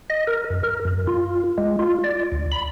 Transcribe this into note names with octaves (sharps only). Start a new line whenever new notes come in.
D#5
A#4
F#2
A#4
F#2
F4
G#3
F4
D5
D2
B5